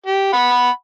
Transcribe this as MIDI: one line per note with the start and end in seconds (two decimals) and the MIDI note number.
0.06 0.29 67
0.33 0.70 78
0.33 0.70 83